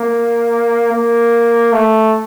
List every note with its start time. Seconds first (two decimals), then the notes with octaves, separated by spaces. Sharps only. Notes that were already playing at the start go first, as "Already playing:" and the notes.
Already playing: A#3
0.93 A#3
1.73 A3